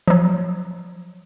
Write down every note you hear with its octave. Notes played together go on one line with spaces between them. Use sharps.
F3 F#3